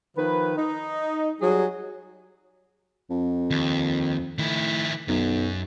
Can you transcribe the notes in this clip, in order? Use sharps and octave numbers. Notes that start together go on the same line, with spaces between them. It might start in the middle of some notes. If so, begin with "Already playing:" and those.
D#3 F3 B4
D#4
F#3 G3 G#4
F2
D#2
A2 D#3 E4
B1 F#2